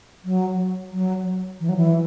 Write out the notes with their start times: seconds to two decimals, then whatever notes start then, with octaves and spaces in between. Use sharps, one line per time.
0.25 F#3
0.92 F#3
1.60 E3
1.69 F#3
1.77 E3